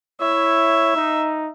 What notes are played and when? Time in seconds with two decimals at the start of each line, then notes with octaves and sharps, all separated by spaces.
0.21 E4 C#5 E5
0.95 D#4